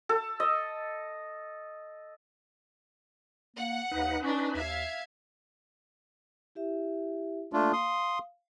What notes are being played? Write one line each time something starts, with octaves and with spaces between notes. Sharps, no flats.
A4
D#5
A#3 F#5
D#2 D#4 B4
C#4 D4
D#2 E5 F5 G#6
E4 G4 E5
A3 A#3 D4 F4 A4
F5 C6 D#6